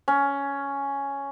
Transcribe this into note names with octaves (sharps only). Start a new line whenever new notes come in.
C#4